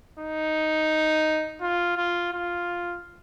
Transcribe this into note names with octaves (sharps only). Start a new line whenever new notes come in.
D#4
F4
F4
F4